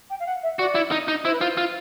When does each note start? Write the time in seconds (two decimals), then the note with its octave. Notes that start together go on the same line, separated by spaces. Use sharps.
0.10 G5
0.20 F5
0.26 F#5
0.43 E5
0.59 F#4 D5
0.75 E4
0.91 D#4
1.08 D#4
1.24 E4 C5
1.33 B4
1.41 F4 C5
1.57 F4